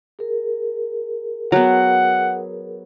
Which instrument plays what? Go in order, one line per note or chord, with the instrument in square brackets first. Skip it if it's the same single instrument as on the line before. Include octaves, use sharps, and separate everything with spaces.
[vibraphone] G#4 A#4
[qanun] F#3 B3 [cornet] F#5